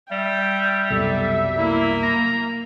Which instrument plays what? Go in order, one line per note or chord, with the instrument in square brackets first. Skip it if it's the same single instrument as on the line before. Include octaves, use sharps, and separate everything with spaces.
[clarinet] G3 [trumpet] E5 [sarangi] G5
[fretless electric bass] C2 F#2 B2 [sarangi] G3 [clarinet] A4
[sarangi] A#3 [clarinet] E4
[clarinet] A#5